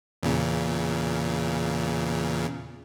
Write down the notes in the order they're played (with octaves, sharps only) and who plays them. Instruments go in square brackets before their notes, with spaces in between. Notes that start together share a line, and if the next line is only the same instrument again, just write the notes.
[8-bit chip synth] E2 A#2 C#3